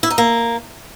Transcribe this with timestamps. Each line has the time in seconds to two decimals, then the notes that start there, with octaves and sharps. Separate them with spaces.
0.03 E4
0.10 D#4
0.18 A#3